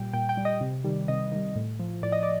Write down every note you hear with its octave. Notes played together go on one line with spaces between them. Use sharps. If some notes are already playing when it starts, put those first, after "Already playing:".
Already playing: A#2 G3 G5
A#2 G5
G5
G3
D#5
C3
D#3 G3
C3 D#5
D#3 G3
A2
F3
A2 D5
D#5
D5